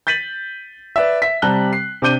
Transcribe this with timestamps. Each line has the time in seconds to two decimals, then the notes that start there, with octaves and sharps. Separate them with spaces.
0.07 G6 A6 B6 D#7 F#7
0.96 B4 D5 E5
1.22 E5 B6
1.42 C3 G3 A5 A#5 F#6 G7
1.73 C7
2.02 C3 D4 D6 G6 D#7 G7